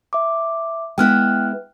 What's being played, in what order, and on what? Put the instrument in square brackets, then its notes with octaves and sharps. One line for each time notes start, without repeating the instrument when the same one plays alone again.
[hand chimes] E5 D6
[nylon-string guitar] G#3 B3 E4 [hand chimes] G5 F6 F#6